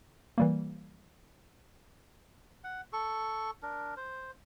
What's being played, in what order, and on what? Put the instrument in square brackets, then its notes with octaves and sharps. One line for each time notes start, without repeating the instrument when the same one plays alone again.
[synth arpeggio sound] E3 G3 A#3
[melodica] F#5
A4 C#6
D4 A#4
C5